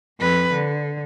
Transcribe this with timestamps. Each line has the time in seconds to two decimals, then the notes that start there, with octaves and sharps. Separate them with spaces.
0.19 F2 B4
0.53 D3